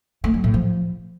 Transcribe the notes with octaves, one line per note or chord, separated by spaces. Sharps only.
A3
F#3
A2
F3